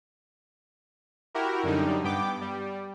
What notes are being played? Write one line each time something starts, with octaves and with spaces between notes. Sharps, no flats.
E4 F#4 G4 A#4
F#2 D3 G3 D#4
G2 B3 G5 D6
G3